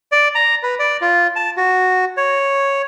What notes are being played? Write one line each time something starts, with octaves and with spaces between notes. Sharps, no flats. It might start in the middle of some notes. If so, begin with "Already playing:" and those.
D5
A#5
B4
D5
F4
A5
F#4
C#5